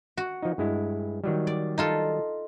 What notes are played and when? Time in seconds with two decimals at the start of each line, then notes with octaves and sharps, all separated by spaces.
0.17 F#4
0.43 F3 D#4
0.58 G2 G#3 E4
1.24 D#3 F#3 G3
1.47 D5
1.78 D#4 F4 A4